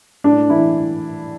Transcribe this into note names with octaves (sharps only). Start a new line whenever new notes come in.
A2 D4
E3 E4